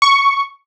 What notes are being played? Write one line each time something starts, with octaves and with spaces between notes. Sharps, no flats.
C#6